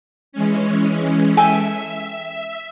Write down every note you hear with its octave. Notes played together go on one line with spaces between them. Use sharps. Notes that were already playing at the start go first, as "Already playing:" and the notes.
E3 G#3 C#4
A4 E5 G5 G#5